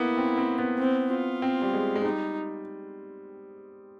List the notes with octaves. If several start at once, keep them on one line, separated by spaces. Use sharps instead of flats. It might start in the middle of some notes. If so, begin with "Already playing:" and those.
Already playing: A#3 B3 E4
C4
C4
B3
C4
F4
C4
G3
G#3
G#3
G3 D#4